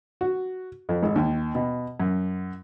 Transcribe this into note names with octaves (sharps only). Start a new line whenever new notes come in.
F#4
F2
G#1
D#2
B2
F#2